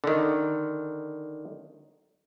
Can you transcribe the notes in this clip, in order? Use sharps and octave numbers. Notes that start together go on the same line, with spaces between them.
D3 D#3